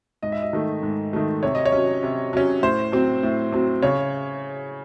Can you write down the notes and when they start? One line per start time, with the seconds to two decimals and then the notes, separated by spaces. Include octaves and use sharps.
0.23 G#2 D#5
0.32 E5
0.42 D#5
0.53 D#3 A3
0.83 G#2
1.13 D#3 A3
1.43 C3 C#5
1.55 D#5
1.65 C#5
1.72 F#3 C#4
2.03 C3
2.33 F#3 C#4
2.63 A2 C5
2.92 F#3 C4
3.23 A2
3.52 F#3 C4
3.83 C#3 C#5